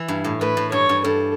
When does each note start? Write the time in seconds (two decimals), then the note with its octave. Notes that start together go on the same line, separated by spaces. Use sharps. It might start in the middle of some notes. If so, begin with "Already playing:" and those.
Already playing: E3
0.08 G2
0.24 A2
0.41 A2 B4
0.57 A2
0.72 G2 C#5
0.89 G2
1.04 G2 A4